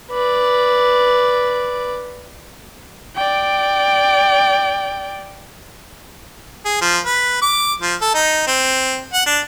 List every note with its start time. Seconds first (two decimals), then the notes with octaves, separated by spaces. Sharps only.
0.11 B4 D5
3.16 D5 G5
6.65 G#4
6.82 F3
7.05 B4
7.42 D6
7.82 F3
8.01 A4
8.15 D#4
8.47 C4
9.13 F#5
9.26 D4